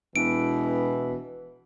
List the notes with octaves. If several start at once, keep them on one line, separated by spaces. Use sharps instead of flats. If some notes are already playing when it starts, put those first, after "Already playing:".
E1 B2 E3 D7